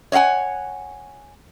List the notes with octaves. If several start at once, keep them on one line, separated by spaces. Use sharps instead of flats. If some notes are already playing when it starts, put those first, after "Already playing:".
C#5 D#5 F5 F#5 G#5